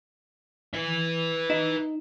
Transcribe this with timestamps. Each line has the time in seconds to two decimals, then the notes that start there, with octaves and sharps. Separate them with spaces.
0.74 B4 E5
1.50 D#4